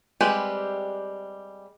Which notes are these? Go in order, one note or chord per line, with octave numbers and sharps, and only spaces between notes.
G3 G#3 C4 G4 B4